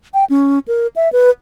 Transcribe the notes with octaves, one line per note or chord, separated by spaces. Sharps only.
G5
C#4
A#4
E5
B4